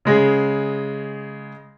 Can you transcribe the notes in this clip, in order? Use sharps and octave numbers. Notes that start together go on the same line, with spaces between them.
C#3 G#3 G#4